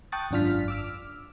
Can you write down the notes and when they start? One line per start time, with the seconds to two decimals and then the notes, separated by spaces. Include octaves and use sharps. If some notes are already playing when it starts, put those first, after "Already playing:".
0.12 G5 A5 C#6 D#6 F#6 A6
0.31 G#1 F#2 D4 F4 F6 B6
0.68 D6 E6 F6